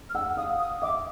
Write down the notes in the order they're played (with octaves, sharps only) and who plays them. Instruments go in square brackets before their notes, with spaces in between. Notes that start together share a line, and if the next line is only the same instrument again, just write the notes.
[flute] F6
[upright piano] F#5 [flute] E6
[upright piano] F5 [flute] D#6
[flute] D#6
[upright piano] E5 [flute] D6